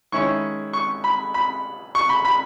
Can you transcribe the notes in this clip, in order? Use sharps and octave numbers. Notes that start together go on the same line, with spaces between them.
D#3 G#3 C#4 E4 C#6
C#6
B5
B5
C#6
B5
B5